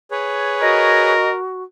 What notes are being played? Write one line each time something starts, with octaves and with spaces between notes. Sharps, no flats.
G#4 B4 C#5
F#4 A#4 D#5